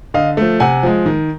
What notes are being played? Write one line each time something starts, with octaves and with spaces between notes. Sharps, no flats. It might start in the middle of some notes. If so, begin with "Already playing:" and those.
D3 D#5 F5
F3 A3
C3 F#5 G#5
F3 G#3
D#3